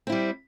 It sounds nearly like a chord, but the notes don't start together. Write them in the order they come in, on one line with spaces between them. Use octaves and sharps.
C4 E4 G3